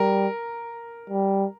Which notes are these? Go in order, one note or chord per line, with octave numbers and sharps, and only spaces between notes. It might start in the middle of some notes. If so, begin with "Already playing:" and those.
Already playing: G3 A#4
G3